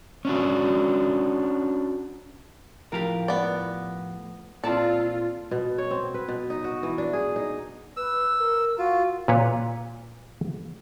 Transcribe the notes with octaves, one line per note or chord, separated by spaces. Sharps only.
C#4 D4 F#4
A2 F3 G4 A#4 F5
B3 D5
A#2 C4 F4 A4 D5 A5
B2
C#5
C4
B4
B2
D#4
F#4
E3
D4
G#4
D#4
B4 E6
A#4
F4 F#4
A#2 B4 C#5